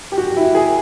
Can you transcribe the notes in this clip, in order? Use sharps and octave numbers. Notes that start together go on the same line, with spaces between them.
G4
F#4
E4
G#4